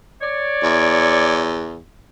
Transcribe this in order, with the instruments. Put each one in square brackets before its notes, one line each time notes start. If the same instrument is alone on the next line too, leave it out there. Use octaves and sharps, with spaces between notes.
[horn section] C#5 D5
[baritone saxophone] E2